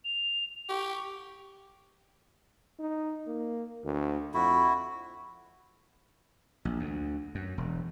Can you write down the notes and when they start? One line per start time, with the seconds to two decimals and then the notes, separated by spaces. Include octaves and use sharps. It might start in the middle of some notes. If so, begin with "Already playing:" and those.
0.05 F7
0.69 G4 C#6
2.79 D#4
3.27 A#3
3.85 D2
4.34 F2 E4 F#4
6.65 A#1
6.80 D2
7.35 F#2
7.58 E1